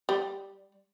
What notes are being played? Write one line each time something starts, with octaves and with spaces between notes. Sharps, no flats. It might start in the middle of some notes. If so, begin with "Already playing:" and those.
G3